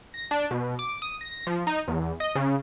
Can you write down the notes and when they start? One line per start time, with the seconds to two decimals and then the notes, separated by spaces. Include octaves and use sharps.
0.14 A#6
0.31 D4
0.51 B2
0.79 D6
1.02 D#6
1.21 A#6
1.47 F3
1.67 D#4
1.88 E2
2.20 D#5
2.35 C#3